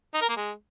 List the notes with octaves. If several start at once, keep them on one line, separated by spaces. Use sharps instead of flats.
D#4
A#4
A#3
G#3